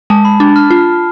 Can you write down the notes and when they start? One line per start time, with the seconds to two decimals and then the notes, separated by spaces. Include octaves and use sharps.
0.10 G#3 A5
0.25 B5
0.40 D4
0.56 F6
0.70 F4